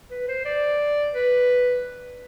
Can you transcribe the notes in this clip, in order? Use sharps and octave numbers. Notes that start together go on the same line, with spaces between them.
B4
C5
D5
B4